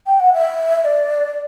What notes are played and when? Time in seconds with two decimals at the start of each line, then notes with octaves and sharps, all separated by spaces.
0.07 G5
0.20 F#5
0.33 E5
0.85 D5